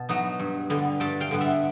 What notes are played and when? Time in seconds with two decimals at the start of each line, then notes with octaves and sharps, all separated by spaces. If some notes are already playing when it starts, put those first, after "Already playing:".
Already playing: B2 A5
0.09 F#3 B3 D#4
0.39 G2
0.70 D3 G3 B3
1.00 G2 G5 A5
1.20 F5 G5
1.31 D3 G3 B3
1.41 E5 F#5